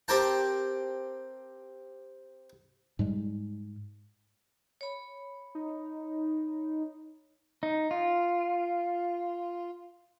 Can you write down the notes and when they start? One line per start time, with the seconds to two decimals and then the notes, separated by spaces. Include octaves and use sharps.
0.08 C4 G4 A#4 G5 A5
2.99 G#2 G3 G#3
4.81 C#5 B5
5.55 D#4
7.63 D#4
7.91 F4